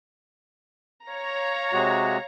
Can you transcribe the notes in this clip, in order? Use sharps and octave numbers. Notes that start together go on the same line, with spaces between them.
C#5 F5 A#5
C3 G#3 F#4